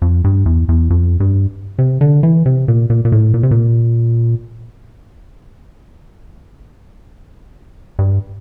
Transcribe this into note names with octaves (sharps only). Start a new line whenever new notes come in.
F2
G2
E2
E2
F2
G2
C3
D3
E3
C3
A#2
A#2
A#2
A2
A#2
C3
A#2
G2